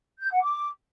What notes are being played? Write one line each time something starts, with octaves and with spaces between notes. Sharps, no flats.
G6
F#5
D6